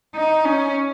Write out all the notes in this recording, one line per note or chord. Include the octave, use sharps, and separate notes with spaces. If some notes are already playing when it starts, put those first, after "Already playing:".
D#4
C#4